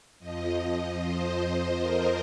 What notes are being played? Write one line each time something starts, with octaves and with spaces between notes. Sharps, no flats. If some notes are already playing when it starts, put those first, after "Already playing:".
F2 F3 D#5
C5
A#4